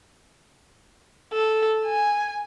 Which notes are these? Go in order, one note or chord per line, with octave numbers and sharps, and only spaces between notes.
A4
G#5